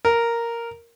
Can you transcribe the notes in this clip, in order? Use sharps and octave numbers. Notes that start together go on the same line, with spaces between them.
A#4